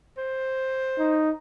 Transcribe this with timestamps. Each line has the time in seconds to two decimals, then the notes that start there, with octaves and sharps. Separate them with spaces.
0.18 C5
0.99 D#4